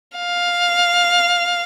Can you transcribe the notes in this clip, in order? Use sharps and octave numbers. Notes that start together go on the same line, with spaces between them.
F5